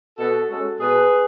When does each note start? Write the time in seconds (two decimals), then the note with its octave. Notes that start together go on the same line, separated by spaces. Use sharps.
0.18 B2 F#4 A4
0.49 G#3 C#4 F#4 A4
0.80 B2 G#4 B4